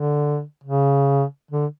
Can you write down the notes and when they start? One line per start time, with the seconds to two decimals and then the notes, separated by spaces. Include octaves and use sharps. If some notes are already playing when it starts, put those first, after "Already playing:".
Already playing: D3
0.64 C#3
1.51 D3